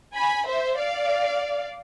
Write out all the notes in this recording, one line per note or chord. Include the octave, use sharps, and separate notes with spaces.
G#5 B5
C5 E5
D5 F5